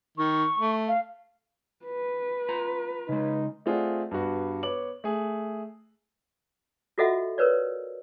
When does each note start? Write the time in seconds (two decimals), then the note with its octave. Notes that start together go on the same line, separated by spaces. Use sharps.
0.18 D#3 C#6
0.58 A3
0.88 F5
1.85 B4
2.49 F4 A#5
3.09 C#3 G#3 D#4
3.66 A3 C4 F4 G#4 D5 F#5
4.11 G2 B3 D4 F#4
4.63 B3 C#5 D6 F#7
5.04 A3 G#4
6.98 F4 F#4 A4 D#5 E5 F#5
7.38 A#4 B4 C#5 D5